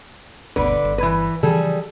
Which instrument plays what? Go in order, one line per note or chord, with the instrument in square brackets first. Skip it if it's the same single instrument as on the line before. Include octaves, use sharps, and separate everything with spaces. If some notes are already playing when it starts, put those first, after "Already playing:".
[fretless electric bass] G1 D2 B2 [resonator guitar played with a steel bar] D3 B4 D5
[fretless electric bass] G1
[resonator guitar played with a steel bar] E3 B4
[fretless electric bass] C#3 E3 F3 [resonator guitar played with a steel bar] G3 G#4 A4